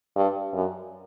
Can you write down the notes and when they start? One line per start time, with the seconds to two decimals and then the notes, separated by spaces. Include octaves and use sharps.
0.16 G2
0.54 F#2